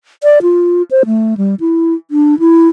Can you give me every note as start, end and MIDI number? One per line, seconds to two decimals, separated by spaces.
0.24 0.39 74
0.42 0.82 65
0.91 1.03 72
1.06 1.34 57
1.37 1.55 55
1.60 1.94 64
2.11 2.39 62
2.39 2.68 64